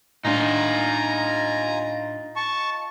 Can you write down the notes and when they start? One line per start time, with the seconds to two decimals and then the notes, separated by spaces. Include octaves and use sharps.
0.25 A2 D4 D#4 F4 G#5 A#5
2.36 A5 C#6